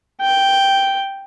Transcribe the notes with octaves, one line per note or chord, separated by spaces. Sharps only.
G5